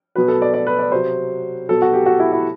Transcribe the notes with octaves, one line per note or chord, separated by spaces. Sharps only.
B2 F#3 B4
A4
D5
D5
B4
D5
C3 F#3 C5
B2 F#3 A4
F#4
G4
F#4
E4
E4